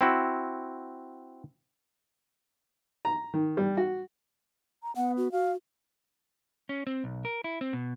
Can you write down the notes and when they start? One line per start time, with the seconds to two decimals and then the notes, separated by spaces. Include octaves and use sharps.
0.01 C4 E4 F#4
3.05 A#5
3.34 D#3
3.57 G3
3.77 F#4
4.83 A#5
4.96 B3 F#5
5.17 F#4
5.32 F#4 F5
6.69 C#4
6.87 C4
7.04 B1
7.25 A#4
7.44 E4
7.61 C4
7.73 B2